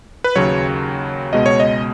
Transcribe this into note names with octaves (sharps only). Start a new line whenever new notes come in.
B4
D#2 C#3 F#3 C#5
C#2 B2 G#3 D#5
C#5
D#5